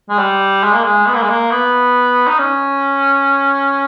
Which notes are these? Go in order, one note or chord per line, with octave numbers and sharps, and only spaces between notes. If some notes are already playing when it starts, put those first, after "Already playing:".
G#3
G3
G#3
A#3
G#3
B3
A#3
G#3
A#3
B3
D#4
C#4